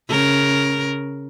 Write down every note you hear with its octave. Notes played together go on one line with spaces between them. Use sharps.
C#3 A#4